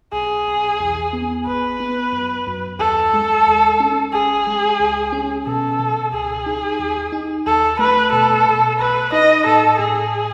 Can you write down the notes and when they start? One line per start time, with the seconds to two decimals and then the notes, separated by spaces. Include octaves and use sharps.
0.13 B1 G#4
0.47 B1
0.80 E2
1.13 B3
1.46 G#1 B4
1.80 B3
2.12 F#2
2.47 F#2
2.79 D#2 A4
3.14 G#3
3.47 D#2
3.80 C#4
4.13 G#1 G#4
4.47 G#3
4.80 C#2
5.12 C#4
5.47 B2 A4
5.79 B2
6.13 C#2 G#4
6.46 D#4
6.80 D#2
7.12 D#4
7.46 D#2 A4
7.79 A3 B4
8.12 B2 A4
8.46 B2
8.79 B1 B4
9.12 D#4 D#5
9.46 A2 A4
9.79 A2 G#4